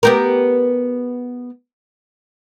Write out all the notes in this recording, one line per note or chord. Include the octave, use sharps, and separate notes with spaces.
B3 G4 A#4